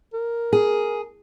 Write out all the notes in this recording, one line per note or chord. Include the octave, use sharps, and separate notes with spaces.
A#4
G#4